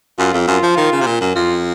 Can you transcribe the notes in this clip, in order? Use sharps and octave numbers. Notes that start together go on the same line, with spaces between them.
F#2 F4
F2
F#2 F4
F3
D#3
C#3
C3
A#2
F#2
F2 F4